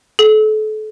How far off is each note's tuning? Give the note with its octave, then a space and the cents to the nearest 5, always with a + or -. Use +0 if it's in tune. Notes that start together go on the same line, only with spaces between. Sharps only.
A4 -35